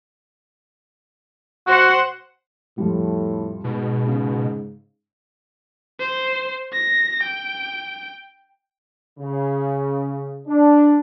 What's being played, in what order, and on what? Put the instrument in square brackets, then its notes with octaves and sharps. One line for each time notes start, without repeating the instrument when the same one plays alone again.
[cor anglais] F#4 [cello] C5 F#5
[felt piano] F2 F3 G3 [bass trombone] A2
[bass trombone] G#2 [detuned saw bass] B2
[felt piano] C#3
[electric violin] C5
A#6
G5
[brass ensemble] C#3
D4